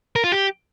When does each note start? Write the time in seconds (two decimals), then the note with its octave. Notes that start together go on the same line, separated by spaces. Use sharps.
0.16 A#4
0.24 F4
0.32 G4